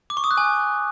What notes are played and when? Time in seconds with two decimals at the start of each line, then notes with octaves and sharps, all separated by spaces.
0.10 D6
0.17 C#6
0.24 D#6
0.31 F#6
0.38 G#5